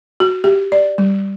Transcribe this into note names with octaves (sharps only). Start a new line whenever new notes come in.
F#4
G4
D5
G3